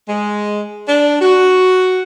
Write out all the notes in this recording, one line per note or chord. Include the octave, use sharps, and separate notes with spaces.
G#3
D4
F#4